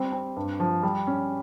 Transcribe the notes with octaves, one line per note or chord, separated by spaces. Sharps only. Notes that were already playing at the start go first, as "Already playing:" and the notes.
Already playing: G3 C4
C4
G2
F3
G3
C#4